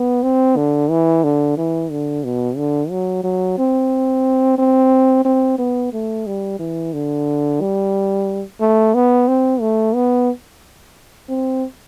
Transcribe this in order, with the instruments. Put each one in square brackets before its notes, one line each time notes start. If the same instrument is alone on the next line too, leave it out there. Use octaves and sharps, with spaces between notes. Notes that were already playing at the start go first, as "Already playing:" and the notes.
Already playing: [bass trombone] B3
C4
D3
E3
D3
E3
D3
B2
D3
F#3
F#3
C4
C4
C4
B3
A3
G3
E3
D3
G3
A3
B3
C4
A3
B3
C4